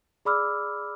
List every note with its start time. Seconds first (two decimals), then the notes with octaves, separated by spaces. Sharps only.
0.25 G#4 D5 B5 D6 E6 F6